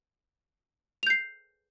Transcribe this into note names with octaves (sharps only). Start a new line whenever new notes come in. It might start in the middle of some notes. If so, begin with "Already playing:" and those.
G6 C7 F7